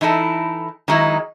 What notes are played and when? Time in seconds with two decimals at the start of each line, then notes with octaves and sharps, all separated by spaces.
0.01 E3 D#4 E4 A4
0.88 D#3 F#3 G#3 D#4 E4